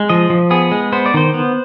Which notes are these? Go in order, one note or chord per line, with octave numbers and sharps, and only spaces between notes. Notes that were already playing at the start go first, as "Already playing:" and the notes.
Already playing: G#3
F3 D#5
F3
B3 G#4
G#3
B3 C5
D5
D#3 C5
B3